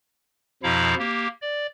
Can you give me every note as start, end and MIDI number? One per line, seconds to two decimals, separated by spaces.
0.63 0.94 41
0.63 0.94 47
0.63 0.94 53
0.63 0.94 64
0.63 0.94 77
0.63 0.94 82
0.98 1.27 58
0.98 1.27 67
1.41 1.66 74